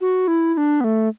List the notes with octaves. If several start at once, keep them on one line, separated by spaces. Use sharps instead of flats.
F#4
E4
E4
D4
B3
A3